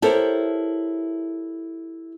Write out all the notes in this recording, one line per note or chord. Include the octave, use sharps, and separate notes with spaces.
E4 G4 A4 A#4 C5 C#5